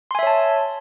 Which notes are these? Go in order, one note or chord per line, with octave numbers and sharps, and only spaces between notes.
C#5 E5 G#5 A5 C6